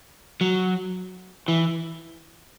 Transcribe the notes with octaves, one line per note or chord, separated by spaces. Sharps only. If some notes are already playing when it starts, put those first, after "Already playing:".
F#3
E3